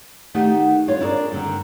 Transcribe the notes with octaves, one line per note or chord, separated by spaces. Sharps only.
D#3 A3 D#4 G4 F#5
G2 F4 C#5
D4 E4 F4 G#4 A#4 D5
G2 D3 D#3